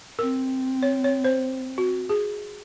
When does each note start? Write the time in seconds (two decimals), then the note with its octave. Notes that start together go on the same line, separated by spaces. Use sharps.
0.19 C4 A#4
0.83 C#5
1.04 C#5
1.24 C5
1.78 F#4
2.10 G#4